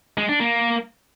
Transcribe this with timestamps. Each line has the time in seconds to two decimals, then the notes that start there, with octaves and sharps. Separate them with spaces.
0.18 G#3
0.29 D4
0.40 A#3